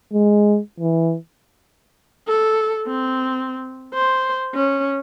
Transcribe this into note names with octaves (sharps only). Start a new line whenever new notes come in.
G#3
E3
A4
C4
C5
C#4